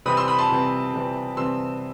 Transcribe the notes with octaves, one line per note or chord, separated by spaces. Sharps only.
C3 E3 G3 C4 B5 D#6
C6 E6
B5 D#6
A5 C6
C3 E3 G3 C4
C3 E3 G3 C4
C3 E3 G3 C4 C6 E6